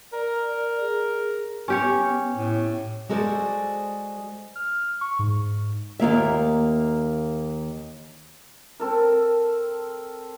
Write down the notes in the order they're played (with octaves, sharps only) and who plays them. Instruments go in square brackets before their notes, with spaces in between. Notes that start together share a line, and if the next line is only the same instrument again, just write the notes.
[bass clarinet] A#4 [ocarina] D5
[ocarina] G#4
[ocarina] B3 [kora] C#4 G4 C#5
[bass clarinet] A2
[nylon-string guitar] G#3 F#4 A4 B4 C5 D5
[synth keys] F6
C#6
G#2
[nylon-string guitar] D#2 B2 A#3 E5
[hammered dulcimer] C4 A4 A#4